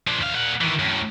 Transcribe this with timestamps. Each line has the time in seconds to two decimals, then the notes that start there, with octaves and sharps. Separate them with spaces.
0.07 F3 D4
0.21 D2 F5
0.34 A#2 F#5
0.61 D#3 E3
0.79 F#2 A2